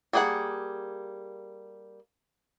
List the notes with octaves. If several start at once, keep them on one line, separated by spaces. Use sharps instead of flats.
G3 A#3 G#4 B4 F#5